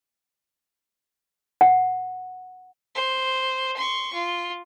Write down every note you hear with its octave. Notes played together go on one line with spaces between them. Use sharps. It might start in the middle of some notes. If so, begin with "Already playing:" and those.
F#5
C5
C6 C#6
F4